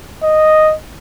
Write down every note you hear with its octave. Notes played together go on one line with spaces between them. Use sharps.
D#5